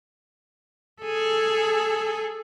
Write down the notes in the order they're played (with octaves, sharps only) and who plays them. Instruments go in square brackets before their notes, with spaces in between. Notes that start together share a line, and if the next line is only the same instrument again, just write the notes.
[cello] G#4 A4